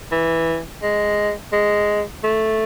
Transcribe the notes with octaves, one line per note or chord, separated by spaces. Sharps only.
E3
G#3
G#3
A3